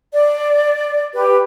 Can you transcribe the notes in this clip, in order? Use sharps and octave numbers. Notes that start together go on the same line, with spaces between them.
D5
G4 B4